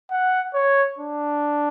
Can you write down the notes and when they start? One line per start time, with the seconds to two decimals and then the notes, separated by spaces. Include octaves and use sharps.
0.11 F#5
0.54 C#5
0.99 D4